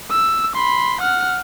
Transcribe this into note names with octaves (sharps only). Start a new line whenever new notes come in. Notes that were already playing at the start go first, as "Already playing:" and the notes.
E6
B5 C6
F#5 F6